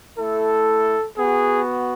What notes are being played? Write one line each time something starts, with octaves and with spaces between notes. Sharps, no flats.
A3 E4 A4
B3 F#4 G#4